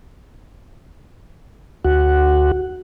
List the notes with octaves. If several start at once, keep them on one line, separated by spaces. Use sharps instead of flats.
D2 F#4 F#5